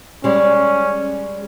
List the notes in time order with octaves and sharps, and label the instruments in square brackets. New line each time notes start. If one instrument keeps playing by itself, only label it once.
[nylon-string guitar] G3 G#3 [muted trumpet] C#4